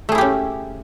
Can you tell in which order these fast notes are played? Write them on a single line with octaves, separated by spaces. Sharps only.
A3 G#4 E4 G4 C#4